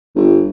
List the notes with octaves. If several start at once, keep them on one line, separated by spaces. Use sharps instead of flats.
G1